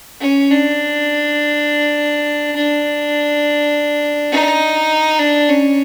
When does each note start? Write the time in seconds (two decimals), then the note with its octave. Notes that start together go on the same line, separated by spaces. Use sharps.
0.21 C#4
0.50 D4
2.55 D4
4.31 D#4
5.19 D4
5.49 C#4